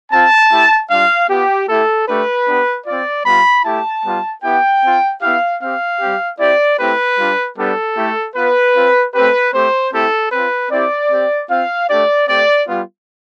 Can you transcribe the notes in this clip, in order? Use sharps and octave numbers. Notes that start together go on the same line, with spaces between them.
C4 F4 A5
A3 E4 G4
G3 D4 F4 F5
B3 F4 G4
A3 E4 G4 A4
A3 D4 G4 B4
B3 D4 G4
C4 F4 D5
G3 B3 F4 B5
A3 E4 G4 A5
G3 B3 F4
B3 E4 G4 G5
C4 F4
B3 E4 G4 F5
C4 G4 F5
G3 C4 G4
C4 E4 G4 D5
A3 C4 E4 G4 B4
G3 D4 F4
G3 B3 D4 G4 A4
A3 E4 G4
B3 F4 B4
C4 F4
A3 C4 G4 B4
A3 C4 G4 C5
A3 C4 E4 G4 A4
C4 F4 B4
C4 E4 G4 D5
C4 G4
C4 F4 F5
A3 D4 G4 D5
A3 C4 G4 D5
G3 B3 F4